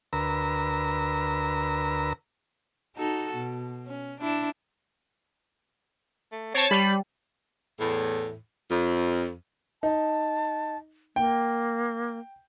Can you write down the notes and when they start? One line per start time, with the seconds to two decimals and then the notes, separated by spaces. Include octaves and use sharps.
0.13 D2 A#4 B4 A#5 E6
2.96 D#4 F#4 A4
3.35 B2
3.86 C#4
4.20 D4 E4
6.32 A3
6.54 C4 C#5 A5
6.71 G3 B5
7.79 E2 A2
8.69 F2
9.83 D#4 A5
11.16 A#3 G5